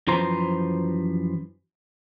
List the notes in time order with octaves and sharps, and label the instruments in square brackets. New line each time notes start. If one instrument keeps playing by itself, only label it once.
[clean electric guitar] F#2 E3 F3 C5 A#5